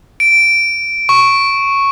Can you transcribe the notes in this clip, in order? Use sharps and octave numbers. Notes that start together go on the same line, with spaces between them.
D7
C#6